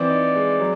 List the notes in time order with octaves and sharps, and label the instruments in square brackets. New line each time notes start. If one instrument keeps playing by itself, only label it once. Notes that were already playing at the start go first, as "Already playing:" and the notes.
Already playing: [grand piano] E3 C4 [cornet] D5
[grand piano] D#4
G#3
F#3